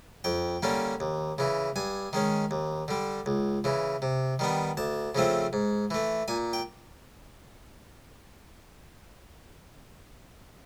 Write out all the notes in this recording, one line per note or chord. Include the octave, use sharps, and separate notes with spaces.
F2 G5
D3 G3 A#3 C#4
D#2
C#3 E3
G2 G#5
D#3 G#3 C#4
D#2
D3 G3
C#2
C#3 E3
C3
D#3 G3 B3
D2 A5
C#3 F3 A3 C4
G#2
E3 A3
A#2 G#5
G5